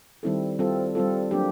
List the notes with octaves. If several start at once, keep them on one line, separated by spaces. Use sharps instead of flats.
D#3 G3 C4 E4 A4
G3 C4 F4 A4
G3 C4 F4 A4
F#3 A#3 D4 G4